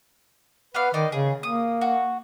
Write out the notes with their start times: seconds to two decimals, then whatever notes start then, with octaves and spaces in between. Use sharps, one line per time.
0.75 B3 B4 D5 F5
0.94 D#3 D#4 D5 D#5
1.12 C#3 G#4
1.43 A#3 D#6
1.81 F#4